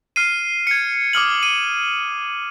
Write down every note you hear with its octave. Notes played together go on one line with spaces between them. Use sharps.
F6 C7 D#7
G#6 C#7
D6 D#6 F6 F#7
D#7